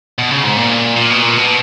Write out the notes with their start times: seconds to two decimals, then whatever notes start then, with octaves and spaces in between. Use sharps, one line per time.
0.18 B2
0.31 C#3
0.44 G#2
0.57 A#2
0.96 A#2
1.10 B2
1.22 A#2
1.36 B2